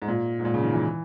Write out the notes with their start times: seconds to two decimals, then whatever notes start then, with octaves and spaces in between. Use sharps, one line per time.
0.02 G#2
0.08 A#2
0.39 G#2
0.45 A#2
0.54 C#3
0.64 D#3
0.73 E3